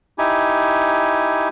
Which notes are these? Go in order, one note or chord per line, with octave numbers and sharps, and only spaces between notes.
D#4 E4 G4 G#5